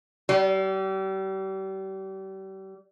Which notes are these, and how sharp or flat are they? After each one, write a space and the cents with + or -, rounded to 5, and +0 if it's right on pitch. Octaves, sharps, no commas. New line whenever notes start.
G3 -35